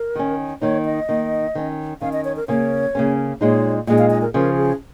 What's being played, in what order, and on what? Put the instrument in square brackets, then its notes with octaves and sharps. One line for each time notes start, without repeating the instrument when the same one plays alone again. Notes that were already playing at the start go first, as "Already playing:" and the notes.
Already playing: [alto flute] A#4
[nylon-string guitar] D#3 C#4
[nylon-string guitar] D#3 A#3 D#4 [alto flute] C#5
[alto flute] D#5
[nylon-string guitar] D#3 A#3 D#4
D#3 C#4
[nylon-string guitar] D#3 C#4 [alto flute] F5
[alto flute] D#5
C#5
A#4
[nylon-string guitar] C#3 A#3 C#4 [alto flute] C#5
[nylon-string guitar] C#3 A#3 C#4
[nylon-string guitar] A#2 G#3 D#4 [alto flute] C#5
[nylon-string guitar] A#2 G#3 D#4 [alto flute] D#5
[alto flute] F5
D#5
A#4
[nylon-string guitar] C#3 F3 C#4 [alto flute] A#4
[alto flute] G#4